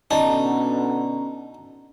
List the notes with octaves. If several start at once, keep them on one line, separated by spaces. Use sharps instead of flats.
B2 D3 C#4 D#4 D5 A5 A#5